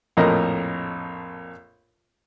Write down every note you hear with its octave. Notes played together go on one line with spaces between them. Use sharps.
A#1 F2 A2 A#4 D#5 A#5